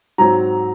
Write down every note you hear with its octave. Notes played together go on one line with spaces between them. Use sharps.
G#2 F#3 C4 A#5